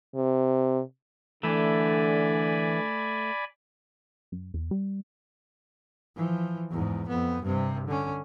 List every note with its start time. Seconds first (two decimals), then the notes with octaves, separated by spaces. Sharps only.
0.15 C3
1.43 D3 E3 A3 D5 G#5 B5
4.32 F#2
4.54 E2
4.71 G3
6.16 E3 F3
6.71 E2 G#2
7.09 F2 B3
7.43 G2 C3
7.87 D3 C#4